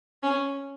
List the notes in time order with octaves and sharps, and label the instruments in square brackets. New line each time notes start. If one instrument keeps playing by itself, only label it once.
[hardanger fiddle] C#4